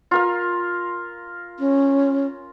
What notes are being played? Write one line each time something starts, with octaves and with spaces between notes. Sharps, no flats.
F4 A#4 F5
C#4